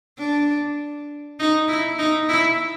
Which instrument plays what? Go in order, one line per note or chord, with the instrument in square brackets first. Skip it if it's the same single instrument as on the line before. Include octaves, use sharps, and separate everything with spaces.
[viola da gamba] D4
D#4
E4
D#4
E4